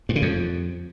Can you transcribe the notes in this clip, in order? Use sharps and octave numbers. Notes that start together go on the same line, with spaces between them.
G2
C#3
F2